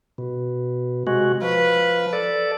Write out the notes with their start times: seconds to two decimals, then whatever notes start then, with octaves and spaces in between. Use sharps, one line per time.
0.18 B2
1.07 C3 G#3 F#4
1.42 F3 B4
2.13 A4 D5